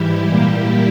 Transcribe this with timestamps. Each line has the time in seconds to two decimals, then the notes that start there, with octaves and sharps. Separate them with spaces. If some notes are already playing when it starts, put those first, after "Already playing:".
Already playing: G#2 E3 G3 E4 G4
0.28 A#2 G3 A#3 E4 G4